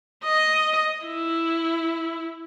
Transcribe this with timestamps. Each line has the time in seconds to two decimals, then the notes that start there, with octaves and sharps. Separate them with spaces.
0.24 D#5
1.05 E4